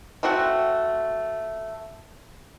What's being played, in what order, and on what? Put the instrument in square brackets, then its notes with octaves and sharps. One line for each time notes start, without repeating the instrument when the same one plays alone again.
[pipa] A3 C4 F#4 F#5